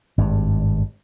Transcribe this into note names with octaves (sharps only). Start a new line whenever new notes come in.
G#1 G2